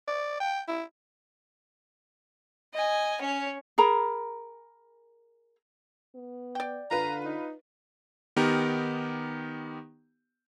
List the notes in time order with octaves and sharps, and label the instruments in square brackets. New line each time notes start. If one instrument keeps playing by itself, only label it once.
[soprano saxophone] D5
G5
E4
[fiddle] D#5 G#5
C#4 C#5
[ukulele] G#4 A#4 A#5 B5
[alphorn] B3
[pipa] D5 G5
[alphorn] D3 [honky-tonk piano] F4 B4 [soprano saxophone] A#5
[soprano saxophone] D#4
[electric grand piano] D#3 B3 D#4 G4 A#4